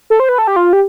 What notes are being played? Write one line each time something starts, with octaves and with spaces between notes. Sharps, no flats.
A4
C5
B4
A4
G4
F4
G4